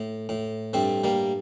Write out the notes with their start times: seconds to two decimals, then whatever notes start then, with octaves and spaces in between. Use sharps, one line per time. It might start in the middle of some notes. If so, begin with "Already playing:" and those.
Already playing: A2
0.29 A2
0.73 G2 A3 C4
1.04 G3 A#3